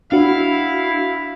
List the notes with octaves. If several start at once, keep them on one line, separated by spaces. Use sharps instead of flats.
D4 E4 F#4 F5